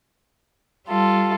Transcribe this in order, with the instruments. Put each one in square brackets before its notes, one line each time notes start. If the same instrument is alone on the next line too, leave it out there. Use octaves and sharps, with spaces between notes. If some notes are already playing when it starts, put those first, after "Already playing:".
[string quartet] G3 F4 A4